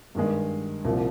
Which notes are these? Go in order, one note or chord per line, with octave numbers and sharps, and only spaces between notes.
G2 D#3 G#3
C2 A#2 F3